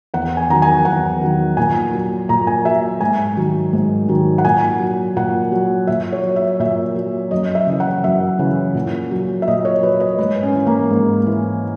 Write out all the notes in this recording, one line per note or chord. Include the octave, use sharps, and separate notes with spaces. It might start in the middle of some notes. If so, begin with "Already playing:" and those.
E2 F#5
G#5
D#3 F#3 A#5
G#5
E2 F#5
D#3 F#3
A#2 G#5
F#3
A#2 A#5
G#5
F#3 E5
G#2 G#5
D#3 F#3
G#2
D#3 F#3
F#5
A#2 G#5
F#3
A#2 F#5
F#3
A#2 E5
C#5
F#3
E5
A#2 E5
F#3
F#2 D#5
E5
C#3 E3
F#5
F#2 E5
C#3 E3
A#2
F#3
E5
A#2 D#5
C#5
F#3 B4
D#5
G#2 B4
C#4
E3
A#3
G#2
E3